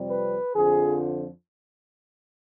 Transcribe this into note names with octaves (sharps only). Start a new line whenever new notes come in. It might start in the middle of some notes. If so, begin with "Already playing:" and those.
Already playing: F2 C3 G3
B4
F2 D3 F3 G#4